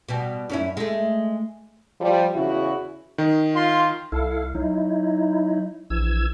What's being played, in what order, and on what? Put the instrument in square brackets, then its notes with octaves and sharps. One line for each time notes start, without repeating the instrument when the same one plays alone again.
[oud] B2 G3
F#2 C#4 E4
G#3 A3
[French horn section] F3 G3
E2 C#3 E4 F#4
[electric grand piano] D#3
[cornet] F4 [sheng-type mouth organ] C6
[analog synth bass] C2 [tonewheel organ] E4 A4 F5
[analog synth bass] F#3 [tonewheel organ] D#4 E4
[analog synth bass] A#1 [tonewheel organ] E3 E6 G#6